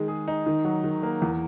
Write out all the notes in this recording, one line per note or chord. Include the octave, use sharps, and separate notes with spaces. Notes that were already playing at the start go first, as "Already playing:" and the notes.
Already playing: D#3 G#3
G#4
D#4
D#3
F#3
D#3
A#3
E2